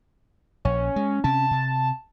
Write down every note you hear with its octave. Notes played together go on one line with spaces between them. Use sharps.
A#1 C#4
G#3
C3 C#4 A5
C3